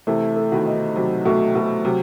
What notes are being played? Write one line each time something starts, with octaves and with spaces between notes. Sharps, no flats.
C3 E3 A3
A4
B2 D#3
D#4
C3 F#3
B2 A3
B2 A4
C3 F#3